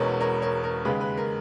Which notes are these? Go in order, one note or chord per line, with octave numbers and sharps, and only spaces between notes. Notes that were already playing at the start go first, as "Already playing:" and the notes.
Already playing: E1 E2 B2 G#3 C#4 A#4 B4 C#5
A#4 C#5
A#4 C#5
A#4
D#2 C#3 G#3 B4
B4
A#4